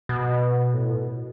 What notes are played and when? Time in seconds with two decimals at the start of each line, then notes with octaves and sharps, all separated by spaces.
0.09 B2
0.74 A2
0.91 B2